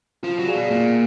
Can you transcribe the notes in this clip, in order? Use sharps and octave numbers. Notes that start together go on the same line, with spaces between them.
F3 F4
F#3
G#4 D5 F5 G#5
B2
A#2 A#3